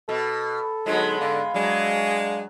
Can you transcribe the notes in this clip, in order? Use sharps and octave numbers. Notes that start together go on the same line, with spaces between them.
B2 A4
D3 F#3 G#3 B3 D#4
G#2 D3 F5
F#3 G#3 D4